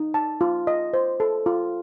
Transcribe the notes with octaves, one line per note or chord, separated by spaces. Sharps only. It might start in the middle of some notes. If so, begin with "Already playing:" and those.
Already playing: D#4
A5
F4
D#5
C5
A4
F4